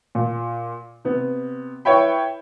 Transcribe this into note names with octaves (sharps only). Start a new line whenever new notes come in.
A#2
C3 B3
E4 B4 C#5 E5 G5 B5